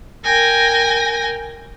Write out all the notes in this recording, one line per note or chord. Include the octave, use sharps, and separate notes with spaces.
A#4 G5 G#5 A#6